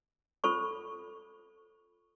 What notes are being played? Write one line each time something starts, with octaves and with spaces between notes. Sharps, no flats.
F4 A4 C5 C#6